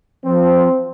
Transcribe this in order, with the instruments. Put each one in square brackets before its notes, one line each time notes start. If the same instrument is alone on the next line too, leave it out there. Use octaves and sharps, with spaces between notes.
[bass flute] F3 [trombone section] C4